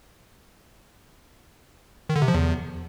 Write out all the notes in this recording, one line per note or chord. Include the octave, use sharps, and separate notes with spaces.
D#3
D3
C3
F3
E2